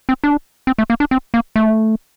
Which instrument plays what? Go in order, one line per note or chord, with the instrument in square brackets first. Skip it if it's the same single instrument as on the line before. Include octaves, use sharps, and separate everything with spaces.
[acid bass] C4
D4
C4
A3
A#3
D4
C4
A#3
A3